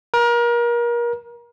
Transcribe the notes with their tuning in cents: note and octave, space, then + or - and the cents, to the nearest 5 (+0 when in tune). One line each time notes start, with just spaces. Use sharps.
A#4 +30